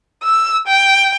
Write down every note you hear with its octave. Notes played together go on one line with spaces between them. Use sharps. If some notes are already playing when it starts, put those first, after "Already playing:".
E6
G5